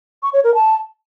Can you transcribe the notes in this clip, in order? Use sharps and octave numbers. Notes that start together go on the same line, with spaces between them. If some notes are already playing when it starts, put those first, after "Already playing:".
C#6
C#5
A#4
A5